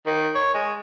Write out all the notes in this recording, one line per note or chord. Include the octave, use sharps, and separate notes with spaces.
D#3
C#5
G#3